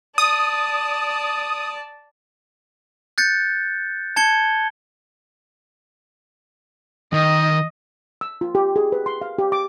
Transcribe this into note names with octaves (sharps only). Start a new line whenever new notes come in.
D5 A5 D#6
F#6 G6 A6 C#7
A5 G#6 C#7 G7
D#3 D#5
E6
F4
G4
G#4
B4
C6
F5
G4
D6